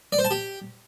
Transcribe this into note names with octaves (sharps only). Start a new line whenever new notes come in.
D5
C5
A5
G4